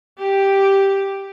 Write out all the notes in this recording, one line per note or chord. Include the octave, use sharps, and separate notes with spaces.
G4